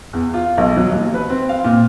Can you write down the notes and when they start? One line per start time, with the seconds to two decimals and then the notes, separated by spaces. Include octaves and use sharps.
0.13 E2
0.34 F4
0.58 B1
0.77 F#3
0.92 D#2
1.14 B4
1.30 C4
1.49 F5
1.64 A#2